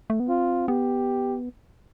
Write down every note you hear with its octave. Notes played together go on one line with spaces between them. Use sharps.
A3
B3
C4 F4
B3 G4